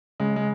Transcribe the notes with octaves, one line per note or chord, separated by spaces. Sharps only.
C#3 G#3
G#3